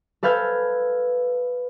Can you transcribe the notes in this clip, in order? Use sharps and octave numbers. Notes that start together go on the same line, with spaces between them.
A4 B4 F5 F6 G6 G#6